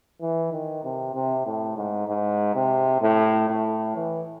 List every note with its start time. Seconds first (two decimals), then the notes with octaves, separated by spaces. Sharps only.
0.21 E3
0.53 D#3
0.84 C3
1.14 C3
1.46 A2
1.77 G#2
2.08 G#2
2.55 C3
3.01 A2
3.48 A2
3.96 E3